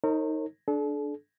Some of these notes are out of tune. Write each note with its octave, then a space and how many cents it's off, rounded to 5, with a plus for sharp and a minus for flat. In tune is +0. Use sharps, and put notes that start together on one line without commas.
D#4 +15 A#4 -35 C#5 -40
D4 +0 A4 -40